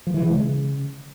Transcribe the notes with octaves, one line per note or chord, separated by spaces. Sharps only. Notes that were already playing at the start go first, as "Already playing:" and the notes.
F3
E3
C#3
G#3
C#3